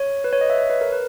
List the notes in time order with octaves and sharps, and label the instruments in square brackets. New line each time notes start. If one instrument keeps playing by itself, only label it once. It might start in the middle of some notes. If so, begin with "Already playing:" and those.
Already playing: [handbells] C#5
B4
C#5
D#5
E5
C#5
B4
A#4
B4